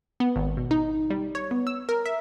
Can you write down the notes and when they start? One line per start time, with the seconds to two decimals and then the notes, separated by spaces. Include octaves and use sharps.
0.20 B3
0.36 G#1
0.57 B2
0.71 D#4
1.10 G3
1.35 C#5
1.51 B3
1.67 E6
1.89 A#4
2.06 E5